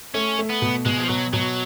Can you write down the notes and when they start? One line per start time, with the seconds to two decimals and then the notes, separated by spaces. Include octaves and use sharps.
0.14 A3 C#4
0.39 A3
0.50 B3
0.62 B2
0.86 B2 G#3
0.98 F3
1.09 B2 F#3
1.33 B2 F#3